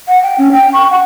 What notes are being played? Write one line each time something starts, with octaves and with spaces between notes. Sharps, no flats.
F#5
G5
C#4
G5
C#6
F#5